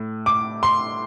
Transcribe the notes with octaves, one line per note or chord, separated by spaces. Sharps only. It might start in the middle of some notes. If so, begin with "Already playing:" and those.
Already playing: A2
D6
C6